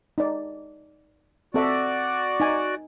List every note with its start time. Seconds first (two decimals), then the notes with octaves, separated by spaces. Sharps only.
0.18 D#4 D5
1.54 C4 F#4 A4 D5 E5
2.40 D#4 G#5